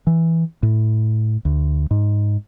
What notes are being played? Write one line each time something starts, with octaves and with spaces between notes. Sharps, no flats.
E3
A2
D2
G#2